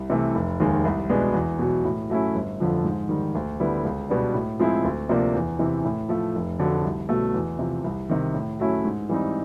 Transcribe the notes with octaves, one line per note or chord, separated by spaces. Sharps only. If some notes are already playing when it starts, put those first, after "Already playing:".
Already playing: C2
C3 E3 A3
F1
D#2 D#3 G#3
C2
B2 G#3 B3 D4
E2
B2 F#3
A2
F#3 A3 C#4 E4
G1
F2 D3 F3
G#2
D#3 G3
D2
D3 G3 B3 E4
C#2
B2 G3 B3 D4
A2
F3 G#3 C4 E4
D2
C3 F3 A#3 D4
E2
C3 E3
A2
F3 A3
F1
F2 D3 F#3
C2
B2 F#3 A3
E2
C3 F3
C2
C3 D#3
A2
F#3 A3 C#4 E4
G#2
E3 G3 C4 D#4